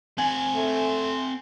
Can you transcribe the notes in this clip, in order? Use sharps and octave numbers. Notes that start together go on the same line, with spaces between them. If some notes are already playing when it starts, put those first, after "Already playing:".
C4 F#5 G#5
A3